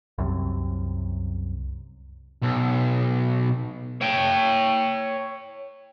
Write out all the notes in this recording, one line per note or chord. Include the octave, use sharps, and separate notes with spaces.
C2 F#2 C3
B1
C#5 G5